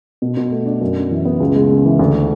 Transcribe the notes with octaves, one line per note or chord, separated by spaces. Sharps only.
B2
B2
A3
D4
F#2
D4
E3
B3
C#2
G#3
C#3
E3
D2